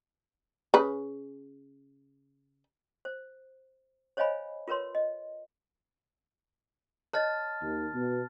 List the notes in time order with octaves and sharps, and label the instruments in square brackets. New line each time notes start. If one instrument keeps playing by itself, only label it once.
[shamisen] C#3 B4
[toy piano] C5
C5 C#5 D#5 F5 G#5 B5
F4 A#4 B4 C#5 C6
D#5
[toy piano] C#5 D#5 [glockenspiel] A5 F6 A6
[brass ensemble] D#2
B2